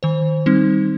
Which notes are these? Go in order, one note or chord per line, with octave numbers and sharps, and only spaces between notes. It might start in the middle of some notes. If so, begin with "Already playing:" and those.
D#3 C5
G3 C4 D#4